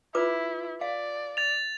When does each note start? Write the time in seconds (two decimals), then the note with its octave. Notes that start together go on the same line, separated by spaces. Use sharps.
0.15 E4 F4 B4 D6
0.81 D5 F5
1.37 A6 F7